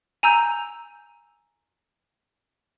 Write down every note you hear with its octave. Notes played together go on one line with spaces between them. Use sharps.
G#5 A#5 E6 G6